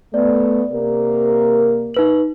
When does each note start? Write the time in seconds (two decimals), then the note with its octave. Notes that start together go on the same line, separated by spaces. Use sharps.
0.14 A3 B3 D5
0.72 C3 A#3 A#4
1.94 D#4 B4 F#7